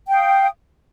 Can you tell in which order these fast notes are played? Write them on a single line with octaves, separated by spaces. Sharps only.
G5 F5 D#6